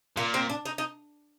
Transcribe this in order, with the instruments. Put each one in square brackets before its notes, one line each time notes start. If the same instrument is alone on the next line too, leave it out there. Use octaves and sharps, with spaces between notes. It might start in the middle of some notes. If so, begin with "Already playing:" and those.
[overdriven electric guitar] A#2 [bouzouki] A#3
[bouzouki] C4
D4
D#4
D#4